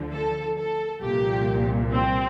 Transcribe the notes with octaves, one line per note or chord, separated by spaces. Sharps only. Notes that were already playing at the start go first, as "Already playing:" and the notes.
Already playing: D2 D3 F3
A4
A4
C2 A#2 F3 G4
C4